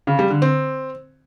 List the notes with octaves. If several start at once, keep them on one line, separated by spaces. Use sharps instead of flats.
C#3
G3
D3
C4